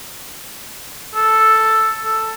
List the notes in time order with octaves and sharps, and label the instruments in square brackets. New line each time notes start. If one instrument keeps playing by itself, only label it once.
[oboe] A4
A4